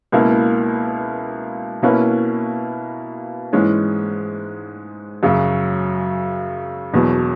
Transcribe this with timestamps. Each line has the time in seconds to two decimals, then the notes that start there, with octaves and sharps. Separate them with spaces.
0.12 C#2 B2 A#3 E4 A#4
1.82 B2 A#3 C#4 E4 B4
3.53 G#2 E3 G#3 C#4
5.23 F#2 C#3 F#3
6.93 E1 E2 B2 F#3